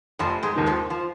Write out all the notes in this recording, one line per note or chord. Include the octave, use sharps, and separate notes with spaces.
F1 F2 F3
G#2 G#3
D#2 D#3 G#3
F2 F3
F3